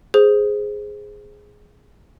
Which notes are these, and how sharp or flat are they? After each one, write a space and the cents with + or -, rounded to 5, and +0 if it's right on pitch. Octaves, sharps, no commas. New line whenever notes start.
G#4 +0 C5 +0